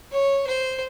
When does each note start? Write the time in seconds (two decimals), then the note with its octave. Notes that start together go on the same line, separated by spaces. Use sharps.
0.12 C#5
0.47 C5